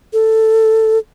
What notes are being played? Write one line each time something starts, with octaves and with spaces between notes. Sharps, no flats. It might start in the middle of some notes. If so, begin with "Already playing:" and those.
A4